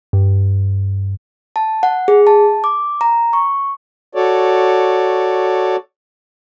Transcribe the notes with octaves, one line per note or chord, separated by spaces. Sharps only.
G2
A5
F#5
G#4
A5
D6
A#5
C#6
F#4 A4 C#5 D5